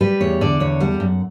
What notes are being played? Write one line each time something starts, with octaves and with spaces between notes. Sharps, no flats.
G3 B4
E2 C#5
D3 D5
E2 C#5
G3 F#5
F#2